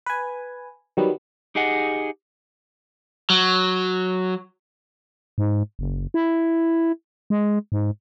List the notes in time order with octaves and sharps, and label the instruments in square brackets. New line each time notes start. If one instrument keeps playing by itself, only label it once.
[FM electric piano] B4 G#5
D#3 F#3 G3 B3
[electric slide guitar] D#4 G4 G#4 D#5 F#5
[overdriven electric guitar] F#3
[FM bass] G#2
F#1
E4
G#3
G#2